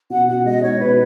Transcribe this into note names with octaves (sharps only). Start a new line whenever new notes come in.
B2 F#5
B2 F#5
G#3 D#5
D#4 C#5
B2 B4